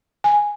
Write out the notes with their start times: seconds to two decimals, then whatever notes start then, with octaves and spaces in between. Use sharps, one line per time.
0.24 G#5